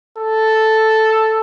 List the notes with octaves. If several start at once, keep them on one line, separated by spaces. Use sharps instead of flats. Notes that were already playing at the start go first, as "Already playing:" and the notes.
A4